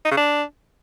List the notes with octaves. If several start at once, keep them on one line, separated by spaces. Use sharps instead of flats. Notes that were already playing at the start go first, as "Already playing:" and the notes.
D#4
C#3
D4